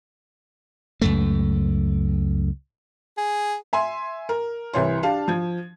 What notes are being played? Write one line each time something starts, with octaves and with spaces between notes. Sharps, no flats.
C#2 F#2 A3
G#4
E5 G#5 C6
A#4
C2 E3 C#5 C6
D4 G4 F5 A5
F3 G#6